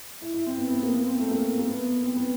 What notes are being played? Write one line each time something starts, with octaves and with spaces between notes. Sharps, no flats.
E4
E4
C4
B3
B3
A#3
B3
C4
A3
A#3
A#3
B3
C4
B3